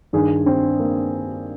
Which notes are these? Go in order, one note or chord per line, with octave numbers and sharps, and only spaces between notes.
G2 D#3 G#4
C4
A#3